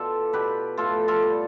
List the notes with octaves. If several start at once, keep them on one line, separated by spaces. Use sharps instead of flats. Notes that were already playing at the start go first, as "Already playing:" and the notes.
Already playing: B2 F4 A4 D5
B2 G4 B4
A2 F4 A4
F4 A4
G3